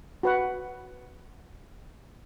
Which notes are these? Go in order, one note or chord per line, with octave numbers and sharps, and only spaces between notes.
F#4 B4 F#5